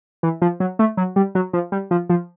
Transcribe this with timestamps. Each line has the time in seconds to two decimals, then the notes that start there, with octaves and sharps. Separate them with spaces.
0.23 E3
0.42 F3
0.60 F#3
0.79 A3
0.97 F#3
1.16 G3
1.35 F#3
1.53 F3
1.72 G3
1.91 F3
2.09 F3